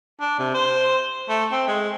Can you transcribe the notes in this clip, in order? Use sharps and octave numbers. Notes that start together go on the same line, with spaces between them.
D4
C3
C5
A3
C4
G#3